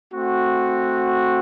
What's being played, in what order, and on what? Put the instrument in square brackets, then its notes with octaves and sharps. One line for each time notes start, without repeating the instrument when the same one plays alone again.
[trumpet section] A3 C4 F#4